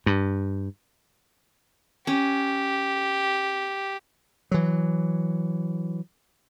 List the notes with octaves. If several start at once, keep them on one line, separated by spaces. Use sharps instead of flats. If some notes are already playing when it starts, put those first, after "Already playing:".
G2
C#4 G4
E3 F#3